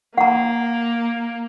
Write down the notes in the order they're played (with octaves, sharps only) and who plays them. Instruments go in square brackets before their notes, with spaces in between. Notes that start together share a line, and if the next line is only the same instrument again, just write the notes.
[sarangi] A#3 [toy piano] F#5 A#5